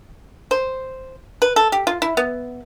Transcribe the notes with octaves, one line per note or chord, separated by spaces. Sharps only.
C5
B4
A4
G4
F4
E4
B3